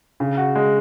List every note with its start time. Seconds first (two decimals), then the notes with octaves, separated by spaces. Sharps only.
0.20 C#3
0.37 F#4
0.55 G#3